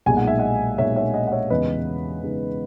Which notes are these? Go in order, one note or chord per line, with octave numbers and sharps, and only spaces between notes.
B1 A#2 G#3 D#4 G#5
F#5
E5
D#5 F#5
B1 A#2 G#3 D#4 C#5 E5
C#5 E5
D#5 F#5
F#5
C#5 E5
E2 C#3 G#3 B3 D#4 B4 D#5
E2 C#3 G#3 B3 D#4